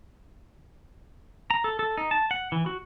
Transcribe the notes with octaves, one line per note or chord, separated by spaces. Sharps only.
A#5
A4
A4
D#4
A5
F#5
E3
F#4